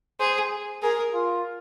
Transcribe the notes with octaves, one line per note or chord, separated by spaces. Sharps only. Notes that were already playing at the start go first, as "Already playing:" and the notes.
G#4 C5
G#4 A#4
F4